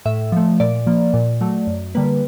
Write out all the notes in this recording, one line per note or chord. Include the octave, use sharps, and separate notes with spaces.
A2 E5
F3 A3
A#2 D5
F3 A#3
A#2
F#3 A3
F#2
D3 G3 A#3 B4